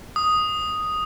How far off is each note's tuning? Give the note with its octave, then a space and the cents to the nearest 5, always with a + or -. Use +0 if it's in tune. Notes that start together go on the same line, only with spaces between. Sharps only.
D#6 +0